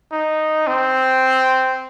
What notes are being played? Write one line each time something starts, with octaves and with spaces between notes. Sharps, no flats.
D#4
C4